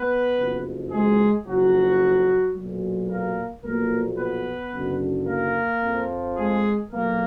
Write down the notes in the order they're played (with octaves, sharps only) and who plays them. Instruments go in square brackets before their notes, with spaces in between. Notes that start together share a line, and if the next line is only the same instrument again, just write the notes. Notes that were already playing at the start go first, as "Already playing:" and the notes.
Already playing: [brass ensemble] B3 B4
F#1 F2 F3
G#3 G#4
F#1 F2 F3 F#3 F#4
B1 A#2 F#3
A#3 A#4
B1 A#2 F3 A#3 A#4
B3 B4
F#1 F#2 D3
A#3 A#4
F2 F3
G#3 G#4
B1 A#2 F#3 A#3 A#4